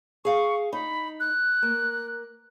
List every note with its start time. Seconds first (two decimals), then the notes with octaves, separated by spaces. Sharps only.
0.25 G#4 F5 C#6
0.73 D#4 B5
1.20 F#6
1.62 A#3